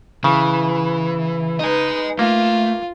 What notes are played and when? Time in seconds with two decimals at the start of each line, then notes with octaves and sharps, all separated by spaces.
0.24 C#3 E3
1.59 D#4 B4 D#5 G#5
2.19 A3 A#3 F4